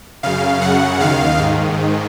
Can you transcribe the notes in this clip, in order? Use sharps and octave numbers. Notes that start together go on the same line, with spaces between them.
F#2 C#3 F5
F#2 C#3 F#5
D#2 D#3 F5
G#2 D#3